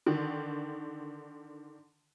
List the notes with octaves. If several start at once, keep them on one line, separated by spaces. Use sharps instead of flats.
D3 D#3